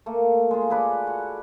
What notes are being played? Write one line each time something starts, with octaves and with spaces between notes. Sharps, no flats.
A3 A#3
G#3 F4
G#4 A4 B4 D5
F#4